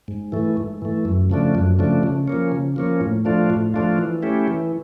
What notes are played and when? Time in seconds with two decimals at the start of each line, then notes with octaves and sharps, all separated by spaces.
0.08 G#2
0.32 E3 A3
0.57 G#2
0.82 E3 A3
1.05 F#2
1.30 C#3 F3 A3 D4
1.55 F#2
1.79 C#3 F3 A3 D4
2.03 C#3
2.28 F3 A#3 C#4
2.52 C#3
2.76 F3 A#3 C#4
3.01 A2
3.25 F3 A3 D4 F4
3.50 A2
3.74 F3 A3 D4 F4
3.98 E3
4.22 A3 C#4 E4 G4
4.48 E3